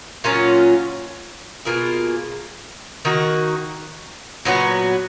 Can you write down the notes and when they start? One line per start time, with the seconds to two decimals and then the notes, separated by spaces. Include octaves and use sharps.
0.24 A#2 F#3 C#4 F4
1.65 B2 A#3 F4 G#4
3.05 D#3 A#3 D#4 F#4
4.45 A#2 F#3 B3 F#4